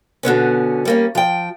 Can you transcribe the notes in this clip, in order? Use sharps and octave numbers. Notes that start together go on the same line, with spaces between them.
B2 D3 B3 C#4
G3 A#3 C#4
F3 G5